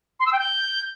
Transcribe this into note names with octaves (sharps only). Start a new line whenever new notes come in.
C6
E6
G5
G6